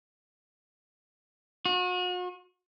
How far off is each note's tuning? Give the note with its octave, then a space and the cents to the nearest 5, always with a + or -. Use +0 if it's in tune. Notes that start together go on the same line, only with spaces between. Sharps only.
F#4 -40